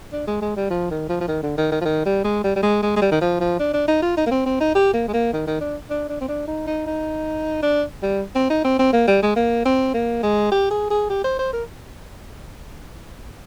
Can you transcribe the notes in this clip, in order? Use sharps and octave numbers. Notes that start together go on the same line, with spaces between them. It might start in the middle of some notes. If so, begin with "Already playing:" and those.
D4
G#3
G#3
G3
F3
D#3
F3
F3
D#3
D3
D#3
D#3
F3
D#3
G3
G#3
G3
G3
G#3
G#3
G#3
G3
D#3
F3
F3
D4
D4
D#4
F4
D#4
A#3
C4
C4
D#4
G4
A#3
G#3
A#3
D#3
D#3
D4
D4
D4
C4
D4
D#4
D#4
D#4
D4
G3
C4
D#4
C4
C4
A#3
G3
G#3
A#3
C4
A#3
G#3
G4
G#4
G#4
G4
C5
C5
A#4